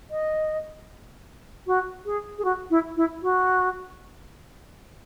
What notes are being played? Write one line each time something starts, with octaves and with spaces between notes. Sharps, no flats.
D#5
F#4
G#4
G#4
F#4
E4
E4
F#4